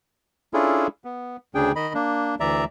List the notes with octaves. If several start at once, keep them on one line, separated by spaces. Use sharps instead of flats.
C#4 D4 E4 F4 G#4 A4
B3
D2 C#3 D4 G#4 G5
D#3 D#5 B5
A#3 D4
D2 E3 D5 E5 A#5